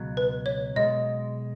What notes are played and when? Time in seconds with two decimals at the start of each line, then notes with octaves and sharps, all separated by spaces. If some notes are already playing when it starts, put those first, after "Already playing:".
Already playing: C#2 B2 F#3
0.17 B4
0.46 C#5
0.76 B1 B2 G#3 D#5